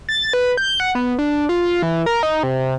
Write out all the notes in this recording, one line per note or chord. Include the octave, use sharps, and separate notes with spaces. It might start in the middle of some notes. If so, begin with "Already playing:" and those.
A6
B4
G6
F#5
B3
D4
F4
F4
E3
A#4
D#4
C3